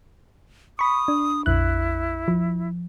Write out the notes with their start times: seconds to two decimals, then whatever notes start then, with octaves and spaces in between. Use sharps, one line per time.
0.79 B5 C#6 D#6
1.08 D4
1.46 A#1 F2 E4 F#6
2.28 F3